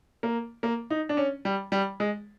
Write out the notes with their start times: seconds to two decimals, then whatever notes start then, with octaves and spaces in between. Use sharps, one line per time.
0.23 A#3
0.63 A#3
0.90 D#4
1.09 D4
1.17 C#4
1.45 G3
1.72 G3
2.00 G#3